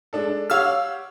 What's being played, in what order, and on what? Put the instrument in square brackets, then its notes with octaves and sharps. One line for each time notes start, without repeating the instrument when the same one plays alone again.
[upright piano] G#3 D4 A4
[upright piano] G4 C#5 F#5 [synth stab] F5 E6 F6